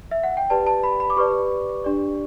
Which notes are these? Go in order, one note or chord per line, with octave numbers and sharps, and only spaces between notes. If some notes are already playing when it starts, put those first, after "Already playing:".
E5
F#5
G5
G4 B4 D5 A5
A5
B5
B5
D6
G4 B4 D5 C#6
D4 G4 D5